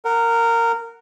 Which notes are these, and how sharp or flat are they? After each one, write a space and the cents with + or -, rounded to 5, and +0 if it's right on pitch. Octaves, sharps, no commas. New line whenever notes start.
A#4 -15 F#5 +0